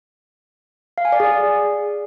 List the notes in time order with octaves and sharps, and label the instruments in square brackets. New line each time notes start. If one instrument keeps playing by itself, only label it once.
[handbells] F5
G#5
D5
G#4